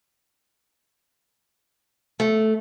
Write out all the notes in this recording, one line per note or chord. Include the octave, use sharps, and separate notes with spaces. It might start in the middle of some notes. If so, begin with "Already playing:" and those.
A3